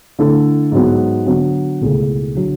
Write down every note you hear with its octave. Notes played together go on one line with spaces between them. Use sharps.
D3 A3 E4 A4
G#2 F#3 B3
D3 F#3 B3
C#2 B2 A3 E4 G#4
D3 F#3